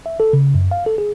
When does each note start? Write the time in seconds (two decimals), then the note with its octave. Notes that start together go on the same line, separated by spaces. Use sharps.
0.06 E5
0.20 A4
0.33 C#3
0.54 F#2
0.71 F5
0.86 A4
0.98 G#4